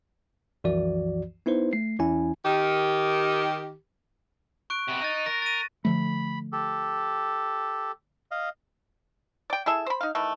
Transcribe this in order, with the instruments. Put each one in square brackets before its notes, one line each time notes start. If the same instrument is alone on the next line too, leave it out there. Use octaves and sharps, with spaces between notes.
[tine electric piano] C2 F#2 E3 F3 F#4 D5
B3 D#4 E4 B4 C5
A3 C7
E2 E3 C#4 E4 G#5
[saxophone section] D#3 G4
[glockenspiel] C#6 F#6 D7
[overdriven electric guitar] C3 B3
[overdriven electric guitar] D#4 [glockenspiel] A6 D#7
[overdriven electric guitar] A#4 [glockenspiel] A#6
[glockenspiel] A6 D#7
[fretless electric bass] D3 F3 A3 [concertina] B5
[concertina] G4 A4
D#5 F5
[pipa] D5 G5
E4 G#4 A4 E5
C5 B5
D#4 F5
D#3 E3 A3